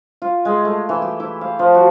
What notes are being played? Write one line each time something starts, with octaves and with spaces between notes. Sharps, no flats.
F4
G#3
A3
E3
G4
E4
F5
F3
F#4